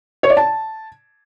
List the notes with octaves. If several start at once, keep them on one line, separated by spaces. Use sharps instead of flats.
C#5
D5
A5